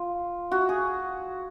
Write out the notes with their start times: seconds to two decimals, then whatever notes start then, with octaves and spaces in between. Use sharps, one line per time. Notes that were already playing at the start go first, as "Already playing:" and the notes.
Already playing: F4
0.51 F#4
0.69 G#4